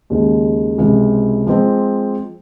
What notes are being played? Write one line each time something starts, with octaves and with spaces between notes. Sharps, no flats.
D#2 C#3 G#3 D#4
C#2 C3 F3
F3 G#3 C4